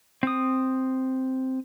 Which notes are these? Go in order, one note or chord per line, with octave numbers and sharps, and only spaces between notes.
C4 D#6